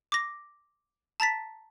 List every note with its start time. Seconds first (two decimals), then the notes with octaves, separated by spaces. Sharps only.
0.12 D6 A#6
1.20 A5 A#5 A6 B6